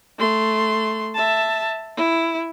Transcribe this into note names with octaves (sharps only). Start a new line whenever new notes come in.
A3 C6
E5 A5
E4